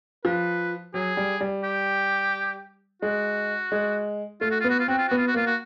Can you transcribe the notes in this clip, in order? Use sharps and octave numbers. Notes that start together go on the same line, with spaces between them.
F3 B4
F#3 G#4
G3
G3
G4
G#3 F#4
G#3
A3 F4
F#4
B3 F4
F#4
F4
C4 F#4
F4
B3 F#4
F4
F#4
A#3 F4
F#4